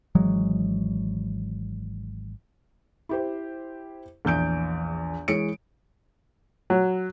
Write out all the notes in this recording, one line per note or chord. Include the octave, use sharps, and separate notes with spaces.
G#1 E3 F#3 G#3
E4 G4 C5
A#1 E2 G6 D7
E3 G#3 C#5 C#7 D7
F#3